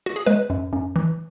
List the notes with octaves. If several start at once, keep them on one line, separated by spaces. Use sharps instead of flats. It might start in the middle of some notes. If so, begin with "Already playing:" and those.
F#4
G#4
G#3 B4
F#2
F#2
E3